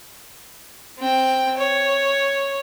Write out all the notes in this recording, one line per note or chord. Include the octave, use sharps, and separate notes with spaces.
C4 G5
C#5